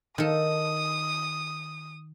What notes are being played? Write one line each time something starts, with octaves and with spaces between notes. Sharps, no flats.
D#3 A4 D#6